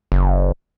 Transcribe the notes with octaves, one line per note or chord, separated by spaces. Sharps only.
F#1